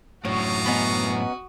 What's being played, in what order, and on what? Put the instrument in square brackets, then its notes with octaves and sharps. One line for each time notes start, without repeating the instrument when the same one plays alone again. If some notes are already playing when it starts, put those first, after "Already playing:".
[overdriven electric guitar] F#2 A2 [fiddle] F#4 D#6 [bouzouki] C#5 [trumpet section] F5 A5 A#5
[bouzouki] B3 C#4 D#4